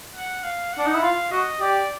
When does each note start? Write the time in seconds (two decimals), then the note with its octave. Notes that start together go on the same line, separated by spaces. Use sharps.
0.15 F#5
0.44 F5
0.73 D4 F#5
0.86 D#4
0.95 E4
1.03 F4 F5
1.32 F#4 D#5
1.61 G4 D5